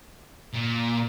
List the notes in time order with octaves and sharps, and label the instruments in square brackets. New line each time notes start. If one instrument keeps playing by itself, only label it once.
[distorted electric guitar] A#2